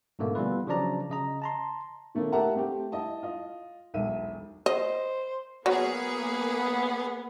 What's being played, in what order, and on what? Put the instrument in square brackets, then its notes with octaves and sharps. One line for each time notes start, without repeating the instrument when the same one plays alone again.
[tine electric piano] G#2 B2 D3 A3 A#3
E3 G3 B3 F4 B4
C#3 F3 F#3 D4 D5 A#5
C#3 D#5 A#5
A5 A#5 C6
[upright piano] D#3 A3 A#3 C#4 E4
G4 A#4 E5 F#5 A5 A#5
A3 C4 G4
E4 D#5 A5
F4 D#5
E1 B1 E5 D#7
[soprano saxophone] C5 [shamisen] D#5
[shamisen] F#3 [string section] A#3 G#4 [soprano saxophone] B3